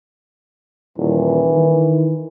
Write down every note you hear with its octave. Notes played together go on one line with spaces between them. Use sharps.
D#1 E3
D#3